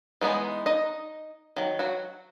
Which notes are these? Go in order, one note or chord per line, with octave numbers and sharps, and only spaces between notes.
E3 G#3 B3 D#4
D#4 D#5
D#3 F#3
F#3 F#4